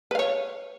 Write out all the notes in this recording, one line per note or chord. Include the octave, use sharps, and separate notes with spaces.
B4 C#5 F5